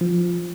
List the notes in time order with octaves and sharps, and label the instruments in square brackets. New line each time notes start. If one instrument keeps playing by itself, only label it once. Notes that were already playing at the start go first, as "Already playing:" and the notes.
[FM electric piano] F3